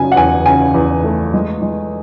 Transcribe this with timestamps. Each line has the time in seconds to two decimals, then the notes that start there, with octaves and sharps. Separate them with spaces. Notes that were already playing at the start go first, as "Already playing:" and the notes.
Already playing: C#3 F#3 G#5
0.12 F#5
0.16 E2 G#5
0.46 C#3 G#5
0.74 E2
1.03 A3
1.34 G#3
1.62 G#3